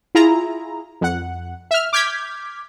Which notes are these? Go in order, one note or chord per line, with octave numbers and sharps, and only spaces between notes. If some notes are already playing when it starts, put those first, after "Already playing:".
E4 F4 G#4 A#5
F2 F#5
E5 F6
D6 F6 G6 G#6 B6